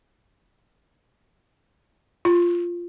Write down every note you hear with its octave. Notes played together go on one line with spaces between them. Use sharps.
F4